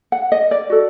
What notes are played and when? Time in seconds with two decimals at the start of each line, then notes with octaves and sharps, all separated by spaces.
0.12 F#5
0.32 D#5
0.51 D5
0.70 F#4 A4